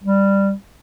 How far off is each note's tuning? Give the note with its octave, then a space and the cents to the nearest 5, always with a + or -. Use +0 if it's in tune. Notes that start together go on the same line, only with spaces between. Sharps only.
G3 +10